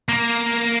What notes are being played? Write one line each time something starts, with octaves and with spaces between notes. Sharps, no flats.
A#3